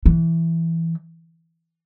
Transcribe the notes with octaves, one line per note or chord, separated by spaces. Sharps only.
E3